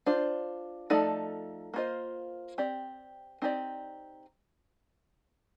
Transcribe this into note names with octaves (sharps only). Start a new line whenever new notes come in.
D4 F4 C5
F3 A3 D#4 A4 D5
A#3 F4 C5 D#5
C4 G4 D5
C4 D#4 G4 D5